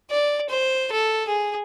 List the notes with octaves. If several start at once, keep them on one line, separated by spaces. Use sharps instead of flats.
D5
C5
A4
G#4